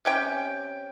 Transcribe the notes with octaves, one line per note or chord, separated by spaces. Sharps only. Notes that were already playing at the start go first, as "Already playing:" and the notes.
C3 C#4 G5